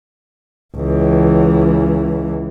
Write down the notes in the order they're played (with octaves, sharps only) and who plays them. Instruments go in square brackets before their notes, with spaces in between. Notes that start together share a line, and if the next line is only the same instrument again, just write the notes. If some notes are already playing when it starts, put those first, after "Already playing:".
[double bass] C#2 E3